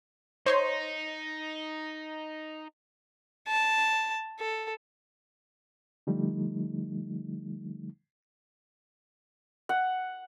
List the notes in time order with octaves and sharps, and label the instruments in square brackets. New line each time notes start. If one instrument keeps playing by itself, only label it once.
[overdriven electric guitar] D#4 [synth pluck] C5 C#5 C6
[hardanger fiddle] A5
A4
[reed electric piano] D3 F3 G3 A3 D#4
[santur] F#5